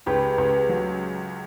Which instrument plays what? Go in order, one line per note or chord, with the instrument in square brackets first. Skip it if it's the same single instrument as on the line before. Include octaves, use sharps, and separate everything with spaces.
[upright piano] C#2 [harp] G4 B4
[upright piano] C#2
F#3